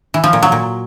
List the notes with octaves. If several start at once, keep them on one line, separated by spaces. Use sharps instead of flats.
E3
F3
A#2
F#3
A#2